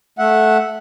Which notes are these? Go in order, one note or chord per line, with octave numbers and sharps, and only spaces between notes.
A3 E5 F#5